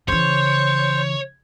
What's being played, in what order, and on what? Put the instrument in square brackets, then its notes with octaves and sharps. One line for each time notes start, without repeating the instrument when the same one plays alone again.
[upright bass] C#3 E3 [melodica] C5 [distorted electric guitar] C#5